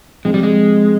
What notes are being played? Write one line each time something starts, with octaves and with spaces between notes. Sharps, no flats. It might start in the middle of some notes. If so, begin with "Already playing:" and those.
C3 F3 G#3 C4
G3
G#3